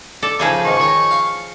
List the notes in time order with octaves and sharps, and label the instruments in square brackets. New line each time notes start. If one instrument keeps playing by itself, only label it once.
[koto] A4 [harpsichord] D5
[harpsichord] C#3 D#4 E5 [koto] F3 G#4 G#5
[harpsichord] C#2 G#2 D#3 [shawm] C#6
[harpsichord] D#3 C#5 A#5
F5